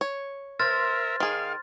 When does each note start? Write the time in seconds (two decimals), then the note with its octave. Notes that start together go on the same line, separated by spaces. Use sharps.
0.01 C#5
0.59 A#4 C5 E5 F6 A6
1.20 D#3 G#4 F5